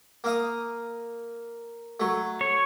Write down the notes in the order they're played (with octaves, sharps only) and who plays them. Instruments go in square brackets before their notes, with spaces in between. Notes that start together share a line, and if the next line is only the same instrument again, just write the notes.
[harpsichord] A#3 F5 D#6
F#3 A3
[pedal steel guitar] C#5